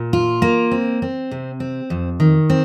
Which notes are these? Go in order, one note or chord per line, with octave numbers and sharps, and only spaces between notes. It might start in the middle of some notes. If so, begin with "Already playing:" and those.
Already playing: A#2
F4
A#3
C4
C4
C3
C4
F2
D#3
C4